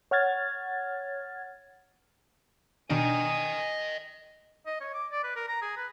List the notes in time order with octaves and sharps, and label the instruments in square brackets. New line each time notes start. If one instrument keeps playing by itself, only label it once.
[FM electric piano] C#5 F#5 F6 G#6 A6
[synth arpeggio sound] B2 D#3 D4 [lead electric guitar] D#5 G5 [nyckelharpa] G#5 D#6
[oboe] D#5
C#5
D6
D5
B4
A#4
A#5
G#4
B4